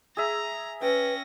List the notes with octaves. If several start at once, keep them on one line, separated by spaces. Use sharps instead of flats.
G#4 E5 A#5
C#4 B4 G5 A#6